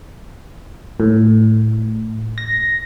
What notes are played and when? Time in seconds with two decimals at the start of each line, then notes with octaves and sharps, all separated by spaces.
1.00 A2
2.38 A#6